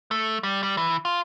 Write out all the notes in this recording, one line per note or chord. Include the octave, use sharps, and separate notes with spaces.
A3
G3
G3
E3
F4